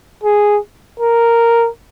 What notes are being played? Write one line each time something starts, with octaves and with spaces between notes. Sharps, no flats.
G#4
A#4